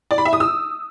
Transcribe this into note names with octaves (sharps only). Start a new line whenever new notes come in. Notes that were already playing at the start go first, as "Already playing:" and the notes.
D5
B5
E5
D#6
E6